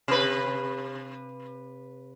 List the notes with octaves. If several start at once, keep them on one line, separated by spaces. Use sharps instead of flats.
C3 B4